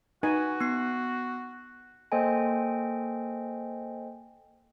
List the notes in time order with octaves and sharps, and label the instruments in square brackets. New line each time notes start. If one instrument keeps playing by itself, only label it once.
[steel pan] D#4 B4 G#5 [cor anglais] F#4
[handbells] B3 C7
A#3 A4 C5 D#5 G5 G#5